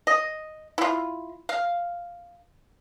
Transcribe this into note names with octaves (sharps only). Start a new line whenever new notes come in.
D#5
E4 F4
F5